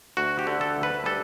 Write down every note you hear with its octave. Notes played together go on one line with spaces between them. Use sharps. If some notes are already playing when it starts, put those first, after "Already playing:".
D2 F#4
G4
D3
A4
D2
B4
G3 A4